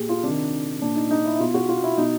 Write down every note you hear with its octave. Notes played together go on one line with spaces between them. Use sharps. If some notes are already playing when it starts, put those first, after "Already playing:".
Already playing: A#2 G4 G#4
F4
C3 D#3 D4
A#2 D4
D#4
D#4
E4
E4
B2 F4
F#4
F4
E4
B2 D#4